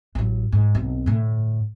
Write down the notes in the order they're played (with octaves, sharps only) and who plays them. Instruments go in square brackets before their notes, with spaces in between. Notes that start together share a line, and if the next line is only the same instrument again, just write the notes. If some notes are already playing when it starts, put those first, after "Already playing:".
[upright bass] A1 F#3
G#2
B1 C4
A2 D3